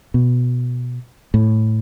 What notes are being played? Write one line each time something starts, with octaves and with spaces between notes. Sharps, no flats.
B2
A2